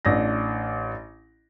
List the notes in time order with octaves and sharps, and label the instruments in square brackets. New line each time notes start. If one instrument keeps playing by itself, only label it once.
[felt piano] A1 D4 A#6